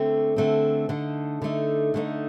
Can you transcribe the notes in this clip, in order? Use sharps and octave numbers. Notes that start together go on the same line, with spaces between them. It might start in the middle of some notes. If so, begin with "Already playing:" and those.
Already playing: D3 A3 C4
D3 A3 C4
D3 A3 D#4
D3 A3 D#4
D3 A3 D#4